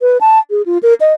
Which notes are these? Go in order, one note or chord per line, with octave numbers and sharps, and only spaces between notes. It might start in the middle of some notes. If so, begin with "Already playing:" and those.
B4
A5
G#4
F4
A#4
D#5